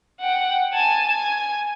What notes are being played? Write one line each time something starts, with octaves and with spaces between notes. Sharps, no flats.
F#5 G5
G#5 A5
G#5